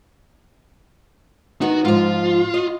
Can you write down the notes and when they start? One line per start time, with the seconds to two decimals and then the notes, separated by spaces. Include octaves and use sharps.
1.61 D#3 B3 D#4 F#4
1.85 G#2 F3 F4
2.54 D#5